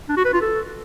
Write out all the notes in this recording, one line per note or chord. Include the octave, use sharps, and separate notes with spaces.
D4
F#4
B4
F4
A4